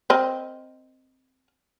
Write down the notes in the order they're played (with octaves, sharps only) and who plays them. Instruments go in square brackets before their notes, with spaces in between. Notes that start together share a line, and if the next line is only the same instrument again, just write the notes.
[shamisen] C4 A#4 D#5